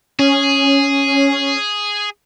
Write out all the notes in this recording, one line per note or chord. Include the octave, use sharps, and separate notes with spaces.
C#4 G#4